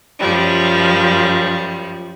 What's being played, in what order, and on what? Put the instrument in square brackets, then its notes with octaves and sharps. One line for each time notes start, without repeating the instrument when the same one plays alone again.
[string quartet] F#2 F3 G3